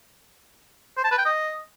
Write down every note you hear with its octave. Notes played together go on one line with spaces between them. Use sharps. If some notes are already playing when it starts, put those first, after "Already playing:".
C5
A5
B4
G5
D#5